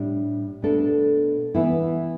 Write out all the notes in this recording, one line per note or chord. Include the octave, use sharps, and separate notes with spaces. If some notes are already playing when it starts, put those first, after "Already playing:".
Already playing: A2 G3 D4
B2 A3 D4 A4
E3 B3 E4